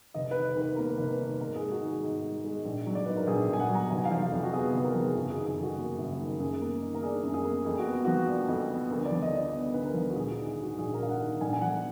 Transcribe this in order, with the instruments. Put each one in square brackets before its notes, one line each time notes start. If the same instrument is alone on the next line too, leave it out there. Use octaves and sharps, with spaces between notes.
[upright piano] F1 D#5
B4
D#3
D#2
B4
A#3 A#4
B4
F1
D#3
G#2 A#4
G#4
G#3
F#4
D#3
G#4
G#2
G#2
G#3
A#1
F#3
D5
G#2 B4
A#4
A#1 G#4
A#1 G#5
F#5
F#3
A#5
F1 G#5
F5
F3
F5
F2
F#4
B3 G#4
G#4
F1
A#4
F3 G#4
F#1 F#4
G#4
D#3
G#4
F2
F#4
A#3
F#1
D#3
F#2 G#4
A#3
D#3
A#4
D4 G#4
F#2
G#4
A#3
F2 G#4
F#4
B3
F#4
F3
D4
F2
B3
D2 A#4
D5
F3
D#5
D3 D5
B3
D2 B4
A#4
F3
F#4
A#1 G#4
G#4
D#3
G#4
G#2
F#4
A#1 G#4
A#4
A#1 F5
F#5
D#3
A#1 G#5
G#5
F3 F#5